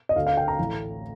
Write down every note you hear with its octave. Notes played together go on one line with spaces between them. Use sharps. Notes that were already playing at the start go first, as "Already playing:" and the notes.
D#5
D2 D3 A3 F5
F5
G5
A#5
A1 A2 A3